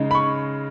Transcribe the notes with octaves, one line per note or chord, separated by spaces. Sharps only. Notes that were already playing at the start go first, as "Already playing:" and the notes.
Already playing: C#3 G#3 D#4
B5
C#6